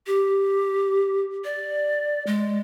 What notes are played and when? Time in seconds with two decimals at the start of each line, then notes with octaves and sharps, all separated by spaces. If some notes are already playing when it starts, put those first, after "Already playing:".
0.07 G4
1.44 D5
2.27 G#3